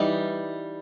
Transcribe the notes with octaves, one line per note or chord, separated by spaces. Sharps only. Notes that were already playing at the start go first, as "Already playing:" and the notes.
Already playing: E3 G3 D#4